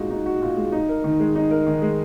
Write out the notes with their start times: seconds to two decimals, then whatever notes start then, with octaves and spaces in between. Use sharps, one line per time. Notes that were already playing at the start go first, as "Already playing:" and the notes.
Already playing: A#2 G#3 D#4 F#4
0.10 D#4
0.26 F#4
0.42 A#2
0.57 G#3
0.72 D#4
0.89 A#4
1.04 D#3
1.20 G#3
1.35 D#4
1.51 A#4
1.67 D#3
1.82 G#3